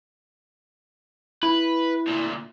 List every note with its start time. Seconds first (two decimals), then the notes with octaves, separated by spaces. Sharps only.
1.43 E4 B4
2.07 D2 A#2